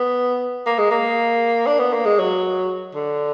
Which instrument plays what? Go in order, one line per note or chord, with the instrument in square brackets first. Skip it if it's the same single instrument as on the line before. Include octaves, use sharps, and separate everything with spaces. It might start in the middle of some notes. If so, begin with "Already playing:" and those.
Already playing: [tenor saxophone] B3
A#3
G#3
A#3
D4
B3
A#3
G#3
F#3
D3